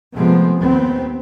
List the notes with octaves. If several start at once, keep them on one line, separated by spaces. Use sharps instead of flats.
C3 F3 G#3 A3 B3 C4
D#2 B3 C4